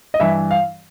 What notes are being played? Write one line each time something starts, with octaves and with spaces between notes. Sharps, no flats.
D#5
G2 E3 E5
F5